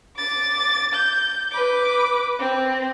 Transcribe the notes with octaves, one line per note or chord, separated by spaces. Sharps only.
D6 A6
G6
B4 D6
C4